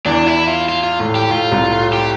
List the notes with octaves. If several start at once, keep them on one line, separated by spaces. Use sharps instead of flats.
E2 E3 D4
E4
F4
F4
F4
A2
G4
A2 F4
C2 C3
A2
G4